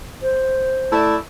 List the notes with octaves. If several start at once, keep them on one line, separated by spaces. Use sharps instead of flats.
C5
A3 E4 D5